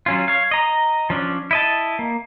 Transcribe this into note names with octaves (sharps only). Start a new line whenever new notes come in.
F#3 C#4 F4
C#5 F5
D#5 A#5
F3 C#4 D4
E4 D#5 A5
A#3